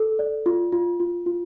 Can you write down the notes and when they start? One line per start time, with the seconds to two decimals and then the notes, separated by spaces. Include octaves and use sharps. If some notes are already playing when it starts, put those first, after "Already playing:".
Already playing: A4
0.19 D5
0.46 F4
0.72 F4
1.00 F4
1.26 F4